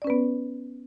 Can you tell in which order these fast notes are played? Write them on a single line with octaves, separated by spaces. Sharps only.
D5 C#4 B4 B3